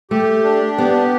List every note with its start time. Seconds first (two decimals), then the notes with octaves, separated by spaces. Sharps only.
0.11 A3 G4
0.44 D4
0.78 B3 G4